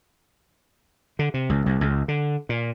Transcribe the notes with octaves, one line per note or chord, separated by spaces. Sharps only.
D3
C3
C#2
C2
C#2
D3
A#2